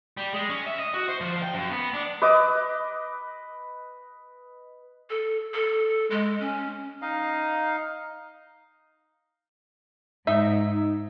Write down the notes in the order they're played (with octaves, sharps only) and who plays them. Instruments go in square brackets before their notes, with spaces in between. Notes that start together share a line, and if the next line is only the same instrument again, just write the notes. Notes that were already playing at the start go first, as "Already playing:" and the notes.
[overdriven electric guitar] G3
G#3
C#4
E5
D#5
F#4
C5
F3
G5
F#2
B3
D4
[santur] B4 D#5 D6
[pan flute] A4
A4
G#3
C#4
[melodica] D#4 D#5 F5
[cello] G#2 [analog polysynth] D#4 [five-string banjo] E5